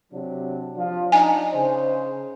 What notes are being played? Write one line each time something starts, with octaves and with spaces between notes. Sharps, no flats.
C3 F#3 D4
F3 D4 F4
D4 D#4 G#5
C#3 C5